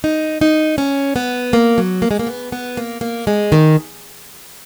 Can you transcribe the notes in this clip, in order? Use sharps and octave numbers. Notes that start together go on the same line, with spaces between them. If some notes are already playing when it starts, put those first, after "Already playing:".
D#4
D#4
C#4
B3
A#3
F#3
A#3
G#3
A#3
B3
B3
A#3
A#3
G#3
D#3